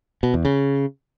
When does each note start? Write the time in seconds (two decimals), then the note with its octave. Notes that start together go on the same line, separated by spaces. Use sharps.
0.23 B2
0.34 E2
0.45 C#3